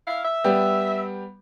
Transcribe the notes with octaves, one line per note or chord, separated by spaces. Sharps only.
E4 F5
E5
G3 B3 G4